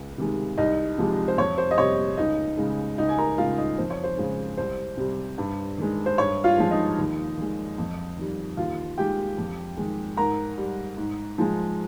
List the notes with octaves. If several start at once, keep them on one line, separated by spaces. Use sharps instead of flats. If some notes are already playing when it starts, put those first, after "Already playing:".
Already playing: C#2
C3 D#3 G#3
C2 D#4 D#5
C3 F3 G#3
C5
F2 C#5
C5
D#5
C3 G3 C#5
C#2 D#4 D#5
C#3 G#3
C#2 D#4 D#5
G#5
A#4 A#5
C#3 G#3 F4 F5
D#4 D#5
F2 C5
C#5
C5
C#3 G#3
C2 C5
C3 G3
G2
D#3 G#3
C5
G2 C#5
F4 F5
F3 G#3
D#4 D#5
D#2
D#3 G#3
F2
D#3 G3
D#2 F4 F5
D#3 G#3 G4 G5
F2
D#3 G#3
G#2 A#4 A#5
G3
G#2
F3 G#3